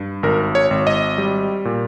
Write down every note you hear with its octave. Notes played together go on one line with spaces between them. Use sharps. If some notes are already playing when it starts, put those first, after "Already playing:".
Already playing: G2
G#1 A#4
C#5
G#1
D#5
G3
A#2